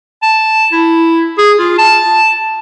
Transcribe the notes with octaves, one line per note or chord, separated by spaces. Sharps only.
A5
E4
G#4
F4
A5